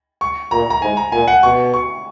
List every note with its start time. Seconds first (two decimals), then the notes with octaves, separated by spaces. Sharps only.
0.21 C#6
0.51 A#2 A#5
0.70 A#5
0.81 G#2 G#5
0.97 A#5
1.12 A#2 G#5
1.28 F#5
1.43 B2 C#6
1.74 C#6